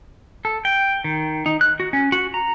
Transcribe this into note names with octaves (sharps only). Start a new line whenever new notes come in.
A4
G5
D#3
D#4
F#6
F#4
C#4
F#4
A#5